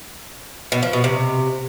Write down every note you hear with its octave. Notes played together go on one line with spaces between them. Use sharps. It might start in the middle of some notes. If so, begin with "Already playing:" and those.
B2
F3
B2
C3